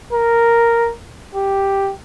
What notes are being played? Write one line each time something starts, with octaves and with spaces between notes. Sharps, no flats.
A#4
G4